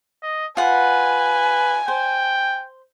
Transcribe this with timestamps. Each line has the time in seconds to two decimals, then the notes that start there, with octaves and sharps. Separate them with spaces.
0.23 D#5
0.57 F4 B4 F#5 G#5
1.88 C5 G5